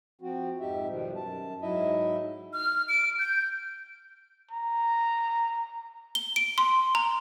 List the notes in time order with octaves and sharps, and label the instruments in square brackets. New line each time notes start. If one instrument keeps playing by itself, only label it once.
[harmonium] F3 C4 F#4
F2 G#2 D#4 G4 E5
B2 D#3 F3 G3
F#2 A5
G#2 F#3 D#4 E4 D#5 E5
[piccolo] F6
D7
G6
[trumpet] A#5
[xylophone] G7
D7
C6
A#5